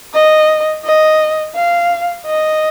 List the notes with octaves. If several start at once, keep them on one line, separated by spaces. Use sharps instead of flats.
D#5
D#5
F5
D#5